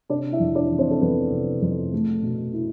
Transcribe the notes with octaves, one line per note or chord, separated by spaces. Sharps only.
C3 D4 D5
E4 E5
F2
D4 D5
E3
C4 C5
A4
F2 B3 B4
C3
F2
A3
B2
E4